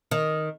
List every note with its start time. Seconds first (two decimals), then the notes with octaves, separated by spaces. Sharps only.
0.11 D#3